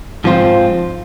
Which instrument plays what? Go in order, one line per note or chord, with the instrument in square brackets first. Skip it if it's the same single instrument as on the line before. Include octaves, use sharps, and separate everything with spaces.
[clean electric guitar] G#2 F3 C4 F4 C5